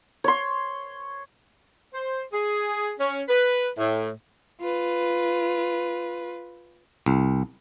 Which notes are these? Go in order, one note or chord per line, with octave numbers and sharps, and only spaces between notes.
C#5 C6
C5
G#4
C#4
B4
A2
F4 B4
C2